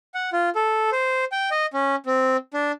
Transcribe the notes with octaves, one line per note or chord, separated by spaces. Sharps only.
F#5
F4
A4
C5
G5
D#5
C#4
C4
D4